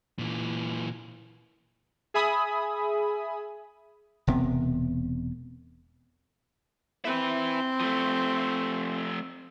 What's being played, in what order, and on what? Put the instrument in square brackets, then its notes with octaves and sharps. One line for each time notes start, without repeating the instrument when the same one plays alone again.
[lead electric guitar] A#2 E3
[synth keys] G#4 E5 G#5 B5 D#6
[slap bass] E1 C3 B3
[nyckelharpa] C4 [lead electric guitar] E4 B4
[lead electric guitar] F3 A3